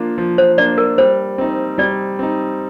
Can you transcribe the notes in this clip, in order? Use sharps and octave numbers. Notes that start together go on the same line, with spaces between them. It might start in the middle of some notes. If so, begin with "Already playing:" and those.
Already playing: F3 A#3 D4 F4
F3
C5
A#3 D4 F4 D5
A#4
G3 C5
C4 D#4
G3 D5
C4 D#4